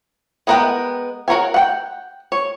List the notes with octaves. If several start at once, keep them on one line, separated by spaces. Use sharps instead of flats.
G#3 B3 A#4 F#5 G5
F#4 A#4 C#5 G#5
F#5 G5
C#5